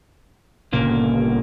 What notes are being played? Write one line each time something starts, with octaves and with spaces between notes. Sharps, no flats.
G1 A#2 C#3 A#3